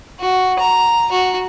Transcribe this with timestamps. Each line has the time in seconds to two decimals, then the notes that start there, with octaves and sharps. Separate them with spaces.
0.19 F#4
0.59 A#5
1.11 F#4